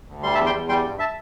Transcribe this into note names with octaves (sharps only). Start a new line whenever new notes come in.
D2
G3 C6
E5 A5
E2
G5 C6
E2
G3 G5 C6
G2
E5 A5